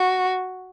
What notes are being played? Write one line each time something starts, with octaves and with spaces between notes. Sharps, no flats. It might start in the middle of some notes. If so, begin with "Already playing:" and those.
Already playing: F#4